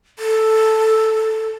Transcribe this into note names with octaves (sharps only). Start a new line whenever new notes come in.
A4